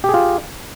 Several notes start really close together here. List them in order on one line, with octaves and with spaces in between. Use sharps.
G4 G#4 F4